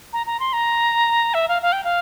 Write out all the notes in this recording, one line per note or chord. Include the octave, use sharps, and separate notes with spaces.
A#5
A#5
C6
A#5
E5
F5
F5
G5
F5